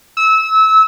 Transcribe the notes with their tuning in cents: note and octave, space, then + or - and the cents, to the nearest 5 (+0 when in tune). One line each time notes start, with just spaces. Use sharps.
E6 -25